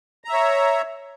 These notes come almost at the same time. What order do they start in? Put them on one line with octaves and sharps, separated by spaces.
A#5 E5 C#5